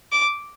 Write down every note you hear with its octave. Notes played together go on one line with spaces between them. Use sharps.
D6